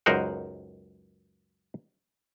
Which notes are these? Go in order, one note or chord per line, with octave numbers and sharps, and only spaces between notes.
C#2 F#2 D#4 A#4 C5 F#5